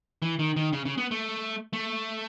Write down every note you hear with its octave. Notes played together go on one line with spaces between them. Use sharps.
E3
D#3
D#3
C#3
C#3
B3
A3
A3